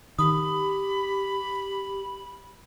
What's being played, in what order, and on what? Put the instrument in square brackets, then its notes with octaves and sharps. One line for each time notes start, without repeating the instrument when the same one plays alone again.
[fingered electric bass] D#3 [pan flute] G4 [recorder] B5 [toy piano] D#6